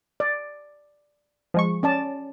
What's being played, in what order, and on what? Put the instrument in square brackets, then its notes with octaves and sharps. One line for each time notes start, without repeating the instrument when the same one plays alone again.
[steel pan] D5
[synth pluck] F3 G#3 C#6
[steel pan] C#4 D5 A5